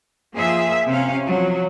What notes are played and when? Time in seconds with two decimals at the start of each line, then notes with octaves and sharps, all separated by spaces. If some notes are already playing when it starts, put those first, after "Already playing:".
0.35 F3 A#3 G#4 E5
0.88 C3 C#4 F5
1.26 F3 F#3